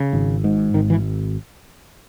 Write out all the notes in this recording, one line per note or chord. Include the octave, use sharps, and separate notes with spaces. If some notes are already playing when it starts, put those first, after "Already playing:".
Already playing: C#3
G#1
G#2
G#1 D#3
E3